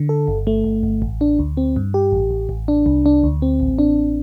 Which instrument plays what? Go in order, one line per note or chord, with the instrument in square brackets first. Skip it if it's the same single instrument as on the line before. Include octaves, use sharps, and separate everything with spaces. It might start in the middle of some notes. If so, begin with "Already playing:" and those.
Already playing: [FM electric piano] D3
A4
G1
A3
G1
G1
A1
D4
D2
C4
G2
G4
A1
A1
A1
D4
C2
D4
D2
C4
A1
D4